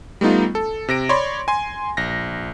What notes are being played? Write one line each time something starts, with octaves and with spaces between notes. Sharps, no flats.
G3 A3 B3 D#4 F4
A4
C3 A#6 D7
C#5 D5 B5 C6
G#5 C6
A#1 A#6